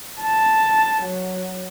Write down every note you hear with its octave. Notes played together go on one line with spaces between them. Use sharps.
A5
F#3